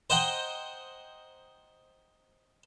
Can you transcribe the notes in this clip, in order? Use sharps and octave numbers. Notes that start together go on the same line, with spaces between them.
C5 D#5 F#5 G5 A#5